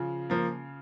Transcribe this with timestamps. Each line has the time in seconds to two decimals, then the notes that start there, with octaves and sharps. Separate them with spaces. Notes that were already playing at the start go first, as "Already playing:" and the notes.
Already playing: C#3 F3
0.30 F3 A#3